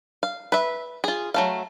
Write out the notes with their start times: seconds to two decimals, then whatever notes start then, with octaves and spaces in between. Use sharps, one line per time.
0.23 F5
0.52 B4 E5
1.04 F4 G#4
1.34 F#3 A3 F5